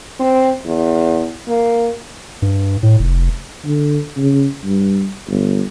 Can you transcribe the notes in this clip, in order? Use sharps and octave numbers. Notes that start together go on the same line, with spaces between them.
C4
E2
A#3
G2
A2
F1
D3
C#3
G2
G1